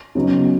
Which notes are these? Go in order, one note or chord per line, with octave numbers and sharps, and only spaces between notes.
C#3 F#3 B3 D#4